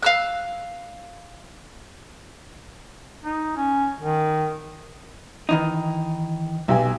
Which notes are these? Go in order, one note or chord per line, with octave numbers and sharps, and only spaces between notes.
F5 E6 F#6
D#4
C#4
D#3
D#3 E3 D#4
B1 G4 G#5